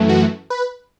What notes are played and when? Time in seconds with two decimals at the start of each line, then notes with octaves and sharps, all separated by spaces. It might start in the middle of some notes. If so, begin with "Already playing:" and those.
Already playing: F#2 E3 A3
0.09 F#4
0.50 B4